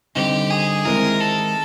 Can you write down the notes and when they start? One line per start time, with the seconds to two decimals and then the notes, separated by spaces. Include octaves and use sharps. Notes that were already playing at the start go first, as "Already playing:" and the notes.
0.15 D3 G3 C4 D#4 G4
0.50 G#4
0.85 D#3 G#3 C4 E4 A#4
1.20 A4